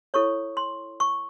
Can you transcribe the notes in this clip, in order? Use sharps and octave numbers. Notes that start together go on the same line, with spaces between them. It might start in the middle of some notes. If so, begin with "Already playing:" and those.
E4 A4 C#5 C#6
C6
C#6